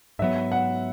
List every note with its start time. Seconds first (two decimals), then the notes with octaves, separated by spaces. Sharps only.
0.19 G#2 F#3 B3 E5
0.52 F#5